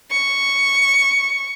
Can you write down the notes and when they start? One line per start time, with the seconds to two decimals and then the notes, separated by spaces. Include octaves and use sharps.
0.11 C#6